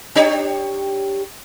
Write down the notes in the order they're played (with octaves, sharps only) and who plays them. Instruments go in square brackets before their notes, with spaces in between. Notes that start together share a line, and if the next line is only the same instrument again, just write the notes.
[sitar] D4 G4 C#5